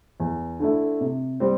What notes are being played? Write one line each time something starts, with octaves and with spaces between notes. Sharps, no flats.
E2
D3 A3 E4
C3
G3 C4